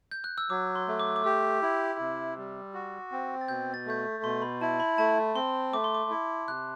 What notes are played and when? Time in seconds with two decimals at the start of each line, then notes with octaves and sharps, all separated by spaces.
0.11 G6
0.24 F#6
0.38 E6
0.50 F#3 D6
0.75 C6
0.88 A3
1.00 D6
1.08 E6
1.16 D6
1.24 G4 E6
1.62 E4 E6
1.99 C3
2.37 G3
2.74 F#4
3.12 C4
3.41 A6
3.48 B2 G6
3.74 A6
3.86 A3 G6
3.99 A6
4.23 B2 C6
4.42 B5
4.61 E4 A5
4.80 B5
4.98 A3 A5
5.35 C4 C6
5.73 A3 D6
5.84 C6
5.95 D6
6.10 E4
6.47 C3 F#6